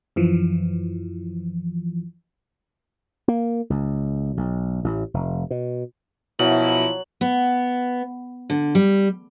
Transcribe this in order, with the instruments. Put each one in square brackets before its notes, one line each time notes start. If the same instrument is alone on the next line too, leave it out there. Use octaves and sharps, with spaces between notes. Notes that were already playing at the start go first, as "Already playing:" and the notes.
[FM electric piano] F#2 E3 F3
[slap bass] A#3
C#2
B1
A1
F1
B2
[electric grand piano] B2 [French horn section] F3 E4 [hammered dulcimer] F#3 [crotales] F#7
[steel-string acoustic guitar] B3
D3
G3